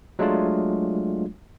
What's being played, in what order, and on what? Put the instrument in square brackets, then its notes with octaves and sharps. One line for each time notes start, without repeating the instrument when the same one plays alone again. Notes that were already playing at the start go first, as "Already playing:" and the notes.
[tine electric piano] F#3 G#3 A3 D4 F4